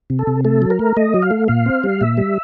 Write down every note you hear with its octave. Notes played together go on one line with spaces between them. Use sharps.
C3
A4
C3
A3 A4
F#3
A#4
A3
A3 D#5
F#3
F5
A3
A#2 F5
C4
G3
A#2 E5
G3